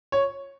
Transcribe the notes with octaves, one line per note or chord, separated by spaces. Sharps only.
C#5